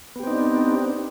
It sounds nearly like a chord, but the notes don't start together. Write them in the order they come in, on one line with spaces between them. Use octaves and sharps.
B3 G4 C4 D#4 D4